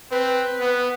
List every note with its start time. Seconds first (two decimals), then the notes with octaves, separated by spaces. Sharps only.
0.11 C4 B4
0.60 B3